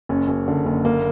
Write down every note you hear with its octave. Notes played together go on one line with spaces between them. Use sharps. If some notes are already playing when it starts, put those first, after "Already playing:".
F#1 C#4
F#1
D3
F#1
A#3